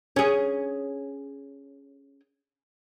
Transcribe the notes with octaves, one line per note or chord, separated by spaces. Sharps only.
C#4 G#4